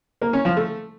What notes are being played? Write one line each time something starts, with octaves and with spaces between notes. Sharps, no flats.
A#3
C#4
F3
A3